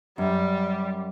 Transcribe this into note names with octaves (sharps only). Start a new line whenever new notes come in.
F#2 G3